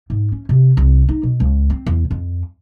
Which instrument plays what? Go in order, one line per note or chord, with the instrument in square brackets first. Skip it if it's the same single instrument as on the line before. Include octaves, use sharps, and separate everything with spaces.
[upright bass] G#2
C#4
C3
C2
D#4
B2
C#2
C4
E2
F2